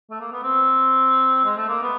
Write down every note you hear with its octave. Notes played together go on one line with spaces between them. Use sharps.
A3
A#3
B3
C4
G#3
A3
A#3
B3